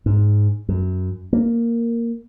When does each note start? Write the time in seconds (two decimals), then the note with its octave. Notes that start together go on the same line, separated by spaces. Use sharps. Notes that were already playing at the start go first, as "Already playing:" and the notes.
0.06 G#2
0.69 F#2
1.33 A#3